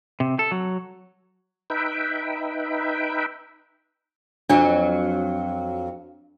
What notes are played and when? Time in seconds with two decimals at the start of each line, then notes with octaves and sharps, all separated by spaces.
0.20 C3
0.39 A4
0.51 F#3
1.70 D#4 B4 E5 G5
4.50 F2 F#3 D4